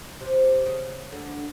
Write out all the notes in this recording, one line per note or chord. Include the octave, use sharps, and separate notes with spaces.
C3
C#3
D2 D3